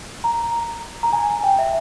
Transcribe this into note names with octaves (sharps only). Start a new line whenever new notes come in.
A#5
A#5
G#5
G5
E5